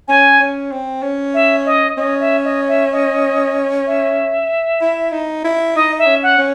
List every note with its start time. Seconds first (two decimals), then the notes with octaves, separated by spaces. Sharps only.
0.08 C#4 G#5
0.40 C#4
0.72 C4
1.02 C#4
1.34 E5
1.66 D#5
1.98 C#4 D#5
2.20 E5
2.44 D#5
2.68 E5
2.92 D#5
3.87 E5
4.81 E4
5.12 D#4
5.44 E4
5.75 D#4 D#5
5.99 E5
6.06 C#4
6.23 F#5
6.38 C#4